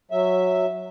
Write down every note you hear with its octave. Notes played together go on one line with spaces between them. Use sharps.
F#3 E5